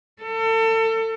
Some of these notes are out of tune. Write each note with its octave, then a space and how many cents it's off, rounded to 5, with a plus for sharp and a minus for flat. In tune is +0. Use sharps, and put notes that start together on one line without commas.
A4 +30